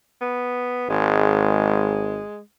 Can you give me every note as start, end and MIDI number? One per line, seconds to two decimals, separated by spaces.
0.21 0.87 59
0.90 2.20 32
0.90 2.40 56